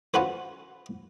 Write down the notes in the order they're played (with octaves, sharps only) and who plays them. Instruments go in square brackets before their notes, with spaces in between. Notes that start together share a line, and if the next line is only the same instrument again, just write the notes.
[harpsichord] C#4 F4 F#4 B4 C5